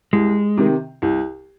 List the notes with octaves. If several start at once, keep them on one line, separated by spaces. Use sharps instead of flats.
C2 G#3
C3 D#3
C2